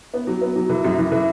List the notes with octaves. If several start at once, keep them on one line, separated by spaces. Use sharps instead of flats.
B3
F#3
B3
F#3
E3
F#2
E3
E3